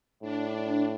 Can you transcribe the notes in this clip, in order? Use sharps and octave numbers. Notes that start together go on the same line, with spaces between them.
A2 D4